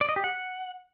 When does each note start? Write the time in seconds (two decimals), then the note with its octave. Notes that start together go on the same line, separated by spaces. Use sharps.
0.01 D5
0.09 D#5
0.16 G4
0.24 F#5